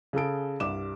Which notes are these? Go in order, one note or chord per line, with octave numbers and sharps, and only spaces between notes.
C#3 G#4 A4 D7
C2 G2 D6 E7